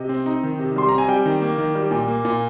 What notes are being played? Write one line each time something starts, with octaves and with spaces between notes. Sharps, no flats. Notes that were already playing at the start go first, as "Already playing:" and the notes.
Already playing: C3 D#5
C4
D#4
D#3
C3
G3 C6
C4 A#5
G#5
G3 G5
D#3
A#3
D#3
G3
A#2
A#3
A#2